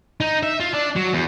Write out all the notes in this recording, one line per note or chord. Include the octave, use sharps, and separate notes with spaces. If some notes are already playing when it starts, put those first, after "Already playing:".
D#4
E5
F4
D4
F#3
E2